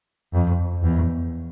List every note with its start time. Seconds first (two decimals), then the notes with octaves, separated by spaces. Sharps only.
0.34 F2
0.83 E2